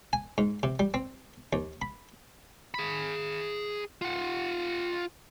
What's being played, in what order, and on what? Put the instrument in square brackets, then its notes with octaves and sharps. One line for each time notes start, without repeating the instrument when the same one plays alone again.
[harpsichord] G#5
G#2
C3
G3
C4
D#2
B5
[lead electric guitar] G#4 B5
F4 F#5